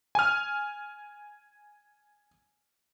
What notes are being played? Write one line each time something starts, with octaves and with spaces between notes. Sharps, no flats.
G#5 F6